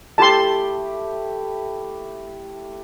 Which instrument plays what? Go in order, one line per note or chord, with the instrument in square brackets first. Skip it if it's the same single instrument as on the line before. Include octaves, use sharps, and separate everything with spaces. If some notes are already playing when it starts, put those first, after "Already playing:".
[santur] A3 E4 G4 [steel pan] A5 C6